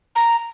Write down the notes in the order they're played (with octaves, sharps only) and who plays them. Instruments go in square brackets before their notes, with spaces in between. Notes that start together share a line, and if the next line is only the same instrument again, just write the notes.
[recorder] A#5